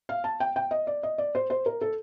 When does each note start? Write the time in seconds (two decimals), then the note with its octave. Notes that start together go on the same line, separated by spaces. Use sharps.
0.09 F5
0.24 A5
0.40 G5
0.56 G5
0.71 D#5
0.87 D5
1.03 D#5
1.18 D5
1.35 C5
1.50 C5
1.66 A#4
1.81 A4